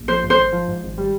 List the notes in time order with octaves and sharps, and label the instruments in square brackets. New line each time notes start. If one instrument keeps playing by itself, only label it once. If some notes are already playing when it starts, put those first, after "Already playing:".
Already playing: [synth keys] A#1
[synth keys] F3 [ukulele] C5
[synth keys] G#2
[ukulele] C5
[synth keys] G#1
F3
G#2
G#1
G3